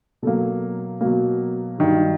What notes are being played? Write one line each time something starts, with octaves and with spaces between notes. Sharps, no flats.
B2 F#3 A#3 A4
B2 F#3 A#3
G2 D#3 F#3